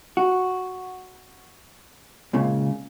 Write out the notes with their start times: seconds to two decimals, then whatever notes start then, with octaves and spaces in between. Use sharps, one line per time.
0.17 F#4
2.33 C#2 A#2 C#3